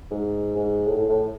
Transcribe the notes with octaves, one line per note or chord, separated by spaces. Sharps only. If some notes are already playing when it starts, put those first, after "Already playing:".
G#2
G#2
A2
A2
A2